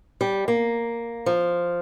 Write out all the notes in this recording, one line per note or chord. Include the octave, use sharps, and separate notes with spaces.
G3
A#3
F3